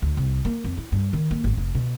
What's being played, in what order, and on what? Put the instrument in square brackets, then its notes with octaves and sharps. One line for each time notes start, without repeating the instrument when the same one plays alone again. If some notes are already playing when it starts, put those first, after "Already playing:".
[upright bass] D2
C2
A#3
F2
E4
G2
D#3
A#3
G#1
F1
B2